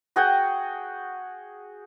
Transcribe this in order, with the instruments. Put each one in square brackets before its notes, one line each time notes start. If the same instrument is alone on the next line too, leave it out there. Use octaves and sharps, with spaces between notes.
[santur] F#4 G#4 F#5 G5